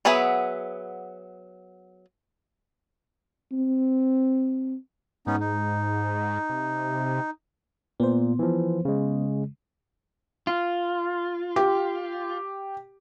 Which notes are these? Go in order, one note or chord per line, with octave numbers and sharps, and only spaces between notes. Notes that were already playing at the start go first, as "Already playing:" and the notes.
F#3 B3 G#4 B4 E5
C4
G#2 B3 C#4 D#4
D#4
C3
A#2 B3 C5
E3 F3
C#3 G#3
F4
G4